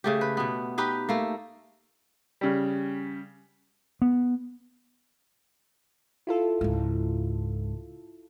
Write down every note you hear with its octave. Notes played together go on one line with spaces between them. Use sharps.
C#3 A3 G4
B4
B2 B3
D#4 G4 B4
A3 A#3
C#3 G3
B3
E4 F4 A4
C#2 G#2